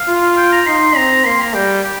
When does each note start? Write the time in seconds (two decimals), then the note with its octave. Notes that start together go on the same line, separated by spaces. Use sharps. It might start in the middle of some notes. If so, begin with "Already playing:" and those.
Already playing: F5
0.08 F4
0.37 G5
0.52 A#5
0.66 D#4 C6
0.96 C4 A#5
1.25 A#3 C6
1.41 A#5
1.55 G3 G5
1.85 G4